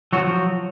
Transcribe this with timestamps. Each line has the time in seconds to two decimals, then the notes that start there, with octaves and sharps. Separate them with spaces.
0.13 F3 F#3 F#4